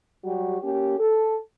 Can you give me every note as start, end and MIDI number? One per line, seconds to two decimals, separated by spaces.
0.24 0.57 54
0.24 0.57 55
0.24 0.57 66
0.24 0.57 67
0.63 0.96 58
0.63 0.96 61
0.63 0.96 67
0.99 1.35 69